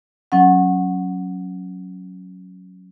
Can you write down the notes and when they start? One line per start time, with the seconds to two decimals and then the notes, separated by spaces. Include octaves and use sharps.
0.32 F#3 C#4 F#5